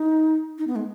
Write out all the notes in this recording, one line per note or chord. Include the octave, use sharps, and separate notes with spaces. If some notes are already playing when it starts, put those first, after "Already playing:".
Already playing: D#4
D#4
B3
G#3